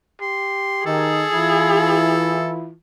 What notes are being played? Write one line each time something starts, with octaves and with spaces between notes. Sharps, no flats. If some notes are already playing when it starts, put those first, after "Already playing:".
G4 C6
D#3 D#4 G#4 A4
E3 E4 F4